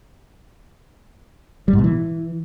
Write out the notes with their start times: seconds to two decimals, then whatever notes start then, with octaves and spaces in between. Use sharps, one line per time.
1.68 G3
1.73 G#2
1.79 B2
1.84 E3